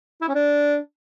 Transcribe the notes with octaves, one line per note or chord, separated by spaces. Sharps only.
E4
C#4
D4